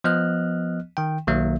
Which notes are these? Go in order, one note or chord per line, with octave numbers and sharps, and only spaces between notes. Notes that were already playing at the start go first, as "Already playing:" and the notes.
F3 B3 D#5 F6 F#6
D#3 G5
B1 D#3 F#3 A#3 E5